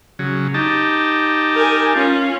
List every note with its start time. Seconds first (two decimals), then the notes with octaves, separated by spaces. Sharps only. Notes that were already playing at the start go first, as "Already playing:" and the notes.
0.19 C#3 F#3
0.54 D#4 G4 A5
1.54 A#4 G#5
1.93 C#4 F4